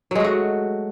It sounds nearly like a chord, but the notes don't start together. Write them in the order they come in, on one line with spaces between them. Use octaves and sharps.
F#3 G#3 A3 F#4